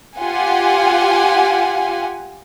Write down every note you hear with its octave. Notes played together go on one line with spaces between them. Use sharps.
F4 G4 F#5 G#5